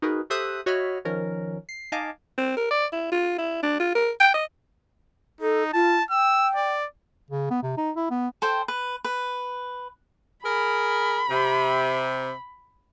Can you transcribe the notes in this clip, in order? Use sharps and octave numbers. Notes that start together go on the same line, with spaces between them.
D#4 F#4 G#4 A#4 B4
G4 A4 C5 E5 D#6 F#6
F#4 C#5 D#5 E5 B5 F6
D#3 F3 C#4 A#4
C7
D#4 D#5 F5 G#5 A5 D6
C4
A#4
D5
E4
F4
E4
D4
F4
A#4
G5
D#5
D#4 A4
F4 A5
G5 E6
D5
C#3
B3
C3
D#4
E4
B3
A4 C5 G5
B4
B4
G#4 A#4 B5
C3